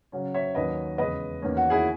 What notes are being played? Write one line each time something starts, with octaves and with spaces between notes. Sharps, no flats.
C#3 F#3 C#4
C#5 E5
D#2 D#3 F#3 C#4 B4 D#5
E2 C#3 G#3 B4 D#5
E2 D#3 A#3 C#4
F#4
E4 G#4